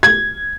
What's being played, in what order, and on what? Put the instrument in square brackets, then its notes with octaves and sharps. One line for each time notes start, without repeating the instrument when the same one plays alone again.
[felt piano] G#6